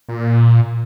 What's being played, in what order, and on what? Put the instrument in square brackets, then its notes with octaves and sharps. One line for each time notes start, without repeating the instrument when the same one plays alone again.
[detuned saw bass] A#2